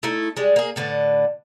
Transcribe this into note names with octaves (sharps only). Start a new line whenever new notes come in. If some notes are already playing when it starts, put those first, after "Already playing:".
A3 D#4 E4
G3 G#3
A#3 G#4
A2 D3 B4